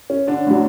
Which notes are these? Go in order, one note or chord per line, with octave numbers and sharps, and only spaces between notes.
C#4
D3 D4
A2 F#3